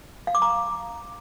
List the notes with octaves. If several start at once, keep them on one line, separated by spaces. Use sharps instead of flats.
F5
D6
A#5